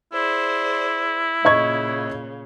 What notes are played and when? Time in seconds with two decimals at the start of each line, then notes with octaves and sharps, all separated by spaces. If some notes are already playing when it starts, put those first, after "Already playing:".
0.13 E4 G#4 C5 D5
1.45 A#2 C#3 D#5 C#6 G#6